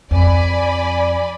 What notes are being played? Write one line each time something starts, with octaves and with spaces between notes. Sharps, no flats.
F2 D5 G#5 B5